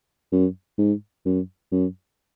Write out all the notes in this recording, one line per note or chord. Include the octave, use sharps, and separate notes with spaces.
F#2
G#2
F#2
F#2